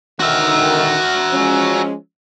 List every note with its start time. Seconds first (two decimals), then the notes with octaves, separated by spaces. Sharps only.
0.20 D3 D#3 F#4 E5
1.33 F3 G#3 C#4